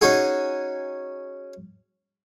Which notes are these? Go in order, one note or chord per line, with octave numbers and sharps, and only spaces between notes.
C#4 D#4 F#4 G#4